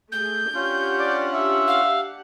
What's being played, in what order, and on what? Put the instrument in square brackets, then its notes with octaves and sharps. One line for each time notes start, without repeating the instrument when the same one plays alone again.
[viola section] A3 G#4 [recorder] G6
[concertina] C#4 F4 [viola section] D4 G4 F#5
[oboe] D5
E5
[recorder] F5